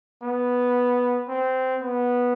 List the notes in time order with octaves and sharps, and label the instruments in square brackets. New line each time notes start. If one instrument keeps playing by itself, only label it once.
[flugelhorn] B3
C4
B3